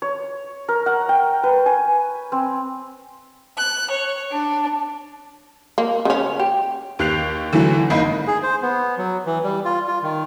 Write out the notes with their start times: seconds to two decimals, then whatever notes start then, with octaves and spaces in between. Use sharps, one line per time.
0.02 C#5
0.69 A#4
0.86 F#5
1.09 G5
1.43 B4
1.66 G#5
2.32 C4
3.57 F#6
3.91 C#5
4.32 D4
5.78 A#3
6.05 C#3 C#4
6.40 G4
6.99 D#2 G4 F#6 C7 F7
7.53 D3 E3 F#3 A3 E4
7.90 G#1 G#2 A#3 D#5 B5 C7
8.27 G#4
8.43 C5
8.62 B3
8.98 F#3
9.26 E3
9.44 G3
9.65 F4
9.87 F4
10.03 D#3